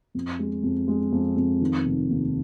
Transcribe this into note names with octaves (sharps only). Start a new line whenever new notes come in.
F2
G#3
F2
G#3
F2
F2
D#3
F1
D#2